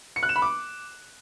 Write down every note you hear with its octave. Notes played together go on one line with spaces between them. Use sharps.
C#7
F#6
E7
B5
D6